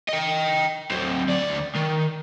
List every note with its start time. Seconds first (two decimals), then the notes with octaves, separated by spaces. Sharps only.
0.09 D#5 G5
0.91 F#3 C4
1.29 D2 D5
1.76 D#3